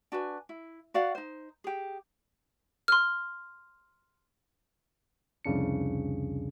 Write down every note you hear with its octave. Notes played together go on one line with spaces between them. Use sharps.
D4 F#4 B4 G#5
E4
F#4 D5 F5 F#5
D#4 C5
G4 G#4
C6 F6
C2 F2 C#3 D4 C#7